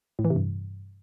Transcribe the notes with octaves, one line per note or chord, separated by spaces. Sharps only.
A2
E3
C3
G2